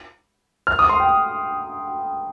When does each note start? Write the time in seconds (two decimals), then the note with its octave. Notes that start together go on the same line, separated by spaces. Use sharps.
0.67 F6
0.79 D#6
0.89 C6
1.00 G5